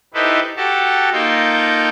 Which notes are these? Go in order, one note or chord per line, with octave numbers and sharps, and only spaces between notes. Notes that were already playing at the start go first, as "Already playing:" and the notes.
D#4 E4 G4 A4 B4 C5
F#4 G4 A4 A5
A#3 D#4 F4 A4 G5